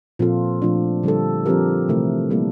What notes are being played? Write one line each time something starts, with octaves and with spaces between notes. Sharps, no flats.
A#2 F3 C4 F4 A4
A#2 F3 A3 D4
D3 G3 D4 A4
F3 C4 G4 A#4
C3 E3 A3 E4 A#4
G3 A#3 E4 A4